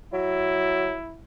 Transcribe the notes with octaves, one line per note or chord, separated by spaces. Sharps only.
F#3 E4